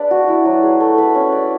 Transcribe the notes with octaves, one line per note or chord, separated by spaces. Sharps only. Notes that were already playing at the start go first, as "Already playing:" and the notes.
Already playing: D4 G#4 B4 D5 E5
F#4
E4
F#3
G#4
A3
B4
C#4
D5